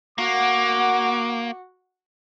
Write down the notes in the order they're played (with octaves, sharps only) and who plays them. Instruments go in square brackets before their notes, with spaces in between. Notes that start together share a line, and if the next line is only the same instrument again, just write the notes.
[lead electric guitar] A#3 [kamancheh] F#4 F#5 [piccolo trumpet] D6